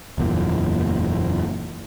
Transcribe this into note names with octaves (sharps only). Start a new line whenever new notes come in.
F#1 E2 A#2